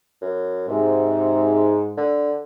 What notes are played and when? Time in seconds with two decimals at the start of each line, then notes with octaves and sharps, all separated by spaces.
0.21 F#2
0.68 G#2 C3
1.97 D3